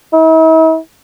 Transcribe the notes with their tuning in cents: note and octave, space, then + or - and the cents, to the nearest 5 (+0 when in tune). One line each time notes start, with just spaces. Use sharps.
E4 -45